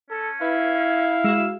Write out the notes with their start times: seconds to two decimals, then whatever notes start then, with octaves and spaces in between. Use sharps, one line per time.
0.10 C#4 A4
0.41 E4 B4 F5
1.24 G#3 F#4 E6